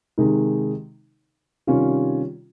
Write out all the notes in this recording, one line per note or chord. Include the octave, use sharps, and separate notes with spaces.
C3 D#3 G#3 D#4
C3 D#3 G3 C#4 F4